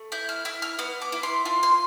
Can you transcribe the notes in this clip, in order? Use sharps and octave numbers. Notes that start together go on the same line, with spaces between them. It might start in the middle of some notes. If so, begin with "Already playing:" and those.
Already playing: A3
E4 G6
F6
E4 E6
F6
B3 F6
D6
E4
C6
F4 C6
C6